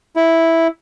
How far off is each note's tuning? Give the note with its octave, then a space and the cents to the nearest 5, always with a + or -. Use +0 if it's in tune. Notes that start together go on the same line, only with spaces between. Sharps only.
E4 -5